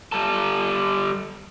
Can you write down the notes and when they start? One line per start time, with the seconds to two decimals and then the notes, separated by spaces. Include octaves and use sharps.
0.12 G3 A4